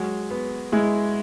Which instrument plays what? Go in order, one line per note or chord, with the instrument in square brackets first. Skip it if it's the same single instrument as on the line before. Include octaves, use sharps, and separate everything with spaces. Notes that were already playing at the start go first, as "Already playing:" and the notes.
Already playing: [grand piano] F#3 [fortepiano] G#3
[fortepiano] B3
[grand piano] G#3 [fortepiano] E4